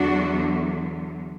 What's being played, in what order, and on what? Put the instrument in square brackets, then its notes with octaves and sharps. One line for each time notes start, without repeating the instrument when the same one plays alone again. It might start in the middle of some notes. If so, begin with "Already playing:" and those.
Already playing: [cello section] E2 D3 F#3 D4 F#4